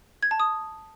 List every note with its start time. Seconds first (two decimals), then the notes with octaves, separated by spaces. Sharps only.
0.23 G#6
0.31 A5
0.40 D#6